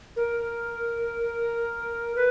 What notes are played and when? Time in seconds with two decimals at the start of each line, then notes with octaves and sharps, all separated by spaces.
0.16 A#4
2.16 B4